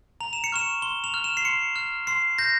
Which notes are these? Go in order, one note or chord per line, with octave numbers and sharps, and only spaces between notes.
A#5 F7
E7
C#7
C#6 F6 E7
C6 G7
F7
F6
E7
C7
C6 C#7
F6
C6 C7
G6 A#6